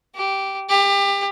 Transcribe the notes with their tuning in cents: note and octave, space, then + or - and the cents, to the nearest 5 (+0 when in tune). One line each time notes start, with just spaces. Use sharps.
G4 -10
G4 +25